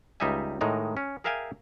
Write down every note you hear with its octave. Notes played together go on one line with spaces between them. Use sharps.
C#2 G3 D#4 D#5 E5 G#5
A2 D#3 G#3 D#4 A#5
C#4
G#4 A#4 E5 F5 G5 G#5